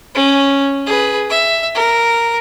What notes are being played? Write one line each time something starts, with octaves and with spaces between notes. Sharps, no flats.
C#4
G#4 B4
E5
A#4